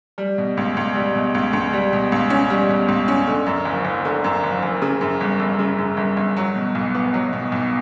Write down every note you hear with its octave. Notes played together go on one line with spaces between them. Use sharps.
G3
B2
C#2
C#2
G3
B2
C#2
C#2
G3
B2
C#2
C#4
G3
B2
C#2
C#4
D3
F#2
F#1
F#1
D3
F#2
F#1
F#1
C#3
F#2
G1
G1
C#3
F#2
G1
G1
F#3
B2
B1
B3
F#3
B2
B1